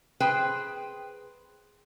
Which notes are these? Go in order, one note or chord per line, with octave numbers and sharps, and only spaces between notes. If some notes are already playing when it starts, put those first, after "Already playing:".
G#4 B4 C5 G5